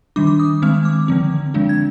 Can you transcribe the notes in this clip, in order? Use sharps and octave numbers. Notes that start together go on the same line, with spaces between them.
D#3 G3 D4 D6
D6
D#6
D#3 G#3 C4 F6
D6
D3 F3 C4
D3 F3 G#3 D4
G#6